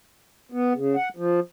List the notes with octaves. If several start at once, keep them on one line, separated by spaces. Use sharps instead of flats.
B3
C#3
F#5
F3